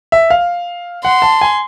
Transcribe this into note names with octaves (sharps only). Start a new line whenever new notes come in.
E5
F5
F#5 C6
A5
G#5